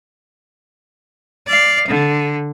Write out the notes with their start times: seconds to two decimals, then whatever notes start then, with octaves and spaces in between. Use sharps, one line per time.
1.47 D5 F5
1.88 D3